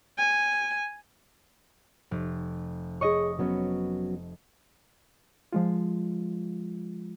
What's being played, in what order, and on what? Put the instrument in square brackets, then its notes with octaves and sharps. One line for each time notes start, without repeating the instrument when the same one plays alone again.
[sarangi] G#5
[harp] F1
[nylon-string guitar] G#4 C#5 [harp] D#5 C#6
[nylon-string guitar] F#3 B3 C#4
[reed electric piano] F3 G#3 F4